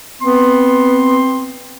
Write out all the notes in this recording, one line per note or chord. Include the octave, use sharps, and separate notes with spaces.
B3 C4 C6